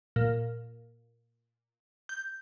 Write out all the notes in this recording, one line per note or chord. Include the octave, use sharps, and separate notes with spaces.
A#2
G6